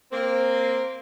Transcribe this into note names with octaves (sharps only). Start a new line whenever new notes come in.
A#3 C4